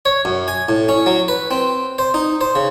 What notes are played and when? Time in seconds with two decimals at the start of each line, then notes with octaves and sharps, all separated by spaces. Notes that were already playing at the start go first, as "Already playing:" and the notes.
0.05 C#5
0.25 F#2
0.48 G#5
0.69 A2
0.89 C#4
1.06 F#3
1.28 B4
1.51 C4
1.98 C5
2.14 D#4
2.41 C5
2.55 C#3